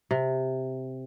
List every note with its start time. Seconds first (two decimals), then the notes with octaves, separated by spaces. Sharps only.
0.11 C3